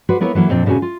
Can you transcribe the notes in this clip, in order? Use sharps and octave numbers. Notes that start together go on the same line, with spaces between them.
F#4 B4 C5 D5
A#3 B3 E4 A#4 C#5
E3 F#3 A#3 E4
F2 A#2 C4 D4
A#2 C#3 C4 F#4 G#5
F4